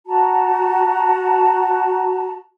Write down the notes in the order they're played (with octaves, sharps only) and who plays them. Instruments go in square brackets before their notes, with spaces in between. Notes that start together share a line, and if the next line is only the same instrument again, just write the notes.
[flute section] F#4 A5 A#5